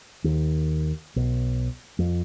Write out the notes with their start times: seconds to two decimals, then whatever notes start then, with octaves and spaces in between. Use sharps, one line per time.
0.24 D#2
1.16 B1
1.99 F2